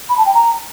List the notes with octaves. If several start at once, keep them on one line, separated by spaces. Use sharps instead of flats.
B5
A5
G5
A#5